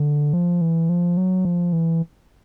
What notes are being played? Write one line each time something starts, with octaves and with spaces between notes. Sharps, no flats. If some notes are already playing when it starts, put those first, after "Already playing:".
Already playing: D3
F3
E3
F3
F#3
F3
E3